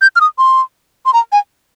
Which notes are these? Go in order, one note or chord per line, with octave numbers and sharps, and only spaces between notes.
G6
F6
D#6
C6
C6
A#5
G#5